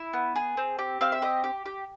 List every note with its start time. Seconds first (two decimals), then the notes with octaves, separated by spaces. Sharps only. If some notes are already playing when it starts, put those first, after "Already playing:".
Already playing: E4
0.13 B3
0.36 G#4
0.57 C4
0.79 G4
1.01 C4 F5
1.12 E5
1.22 G4 D#5
1.44 G4
1.66 G4